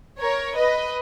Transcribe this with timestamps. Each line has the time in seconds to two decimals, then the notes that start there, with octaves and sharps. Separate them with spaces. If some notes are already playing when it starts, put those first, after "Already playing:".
0.20 A#4 C#5
0.57 B4 D#5